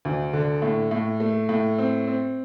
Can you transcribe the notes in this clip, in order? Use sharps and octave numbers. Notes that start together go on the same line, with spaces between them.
D2
D3
A2
A2
A3
A2
C4
C4